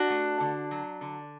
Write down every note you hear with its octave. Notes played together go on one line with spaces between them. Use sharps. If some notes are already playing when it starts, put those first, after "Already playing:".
Already playing: D4 F#4
A3
D3
F#3
D3